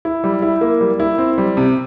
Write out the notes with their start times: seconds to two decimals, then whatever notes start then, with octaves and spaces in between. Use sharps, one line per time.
0.05 E4
0.24 G3
0.42 E4
0.61 A#3
0.81 G3
1.00 E4
1.18 C4
1.38 G3
1.57 C3